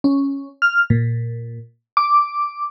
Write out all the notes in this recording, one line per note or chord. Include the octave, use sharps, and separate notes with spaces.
C#4
F6
A#2
D6